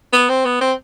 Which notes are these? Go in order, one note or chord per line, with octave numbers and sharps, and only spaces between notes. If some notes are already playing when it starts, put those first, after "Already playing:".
B3
C4
B3
C4